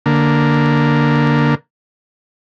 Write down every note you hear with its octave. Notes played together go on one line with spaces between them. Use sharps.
D3 A#3